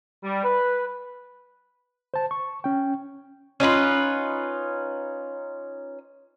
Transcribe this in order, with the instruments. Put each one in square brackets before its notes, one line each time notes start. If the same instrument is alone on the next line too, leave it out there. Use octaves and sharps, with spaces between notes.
[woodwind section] G3
B4
[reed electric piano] C5 A5
C#6
C#4 G5
[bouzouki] C#4 D#4 F4 B4